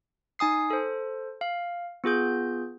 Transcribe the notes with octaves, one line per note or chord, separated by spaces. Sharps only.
D#4 G#5 D#6 C7
A4 C5
F5
B3 F4 G#4 G6